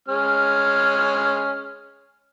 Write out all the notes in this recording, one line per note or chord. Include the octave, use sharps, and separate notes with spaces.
G#3 C#4 F6